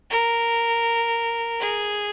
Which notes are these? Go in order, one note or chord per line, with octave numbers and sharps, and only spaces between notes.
A#4
G#4